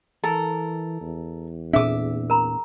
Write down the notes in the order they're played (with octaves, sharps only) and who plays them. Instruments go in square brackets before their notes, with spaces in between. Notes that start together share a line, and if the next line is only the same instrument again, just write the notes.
[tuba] E3 [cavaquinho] A4 A#4
[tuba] E2
[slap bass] A#2 C4 D4 [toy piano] G#4 A4 [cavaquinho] E5 D6
[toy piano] A#4 A#5 B5